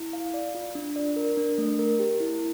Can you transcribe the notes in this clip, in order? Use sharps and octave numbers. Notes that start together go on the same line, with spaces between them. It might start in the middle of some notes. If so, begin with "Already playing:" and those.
Already playing: E4
F5
D5
F4
D4
D5
A#4
D4
A3
A#4
G4
E4